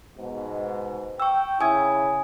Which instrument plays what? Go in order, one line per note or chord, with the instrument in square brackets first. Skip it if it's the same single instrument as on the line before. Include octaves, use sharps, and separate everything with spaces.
[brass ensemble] G#2 B2
[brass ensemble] G5 [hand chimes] C#6 E6
[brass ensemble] C#3 E4 [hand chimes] G#5 D#6 G#6